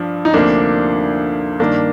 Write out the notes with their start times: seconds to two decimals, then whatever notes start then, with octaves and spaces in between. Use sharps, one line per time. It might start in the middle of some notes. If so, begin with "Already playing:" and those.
Already playing: G2 F3 D4
0.25 D#4
0.33 D2 C3 F3 A#3 D4
1.60 G2 D#3 A#3 D4